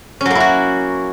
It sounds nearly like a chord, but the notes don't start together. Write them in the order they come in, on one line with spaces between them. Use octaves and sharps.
C#4 F#3 A#3 E4 F#4